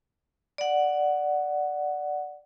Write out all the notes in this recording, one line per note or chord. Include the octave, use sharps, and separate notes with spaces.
D5 F#5